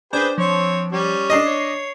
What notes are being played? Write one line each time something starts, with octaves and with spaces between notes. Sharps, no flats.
D4 G#4 B4 C5 G5
F3 C4 C#5
G3 C#4
D4 D#5 C7
C#5